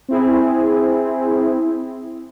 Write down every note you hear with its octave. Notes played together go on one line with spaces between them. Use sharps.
C4 E4 G#4